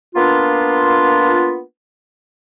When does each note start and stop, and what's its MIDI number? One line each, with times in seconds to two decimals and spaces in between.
0.15 1.60 58
0.15 1.60 59
0.15 1.60 62
0.15 1.60 65